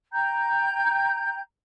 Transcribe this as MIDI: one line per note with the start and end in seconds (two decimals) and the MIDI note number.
0.12 1.38 79
0.12 1.38 82
0.12 1.38 91